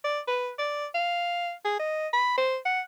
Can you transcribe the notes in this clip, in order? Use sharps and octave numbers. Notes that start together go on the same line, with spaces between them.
D5
B4
D5
F5
G#4
D#5
B5
C5
F#5